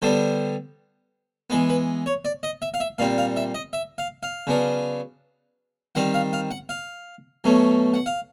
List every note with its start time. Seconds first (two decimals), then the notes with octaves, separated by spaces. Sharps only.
0.02 D3 G3 B3 D4 C5
1.50 E3 G#3 B3 B4
1.69 B4
2.06 C#5
2.25 D5
2.43 D#5
2.62 E5
2.74 F5
2.80 E5
2.98 A#2 G3 C4 F5
3.18 F5
3.36 E5
3.54 D#5
3.73 E5
3.98 F5
4.23 F5
4.47 C#3 F#3 B3 D4
5.95 D#3 G3 C4 F#5
6.14 F5
6.33 F5
6.51 F#5
6.69 F5
7.44 B2 F#3 A3 C#4
7.94 F#5
8.06 F5